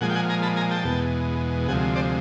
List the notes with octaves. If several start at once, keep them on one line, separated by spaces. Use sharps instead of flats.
A#2 F3 G#3 F#5 G#5
G5
F#5 G#5
G#5 A#5
A5 B5
G#5 A#5
G5 A5
E2 B2 G#3
D2 C3 F3 G#3 F#5 G#5
C5 D5